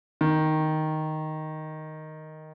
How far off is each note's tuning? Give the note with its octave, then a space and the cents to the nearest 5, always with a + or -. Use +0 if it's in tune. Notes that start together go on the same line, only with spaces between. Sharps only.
D#3 +0